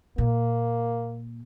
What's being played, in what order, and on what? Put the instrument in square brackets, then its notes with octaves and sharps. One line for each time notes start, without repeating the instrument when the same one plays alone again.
[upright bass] A#2 [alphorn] A#3